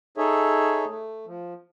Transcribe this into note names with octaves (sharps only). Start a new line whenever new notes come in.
D#4 G#4 A4 C#5 E5
A3
F3